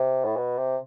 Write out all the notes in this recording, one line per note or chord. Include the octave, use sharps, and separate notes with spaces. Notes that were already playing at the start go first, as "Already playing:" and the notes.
Already playing: C3
A2
B2
C3